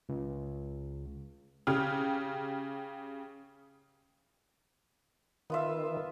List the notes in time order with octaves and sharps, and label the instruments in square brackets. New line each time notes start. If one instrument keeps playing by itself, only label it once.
[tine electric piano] C#2
[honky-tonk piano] C#3 G4 F6
[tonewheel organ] D#3 [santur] B3 F4 E5